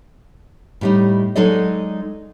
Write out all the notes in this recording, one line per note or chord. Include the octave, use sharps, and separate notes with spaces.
A2 G3 D#4
F#3 G#3 D#4 A4 D5 D#5